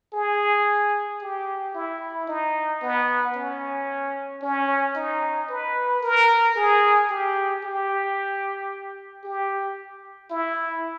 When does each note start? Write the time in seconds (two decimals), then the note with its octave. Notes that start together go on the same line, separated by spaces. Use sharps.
0.14 G#4
1.21 G4
1.74 E4
2.28 D#4
2.82 B3
3.36 C#4
4.42 C#4
4.96 D#4
5.50 B4
6.03 A#4
6.56 G#4
7.10 G4
7.64 G4
9.24 G4
10.31 E4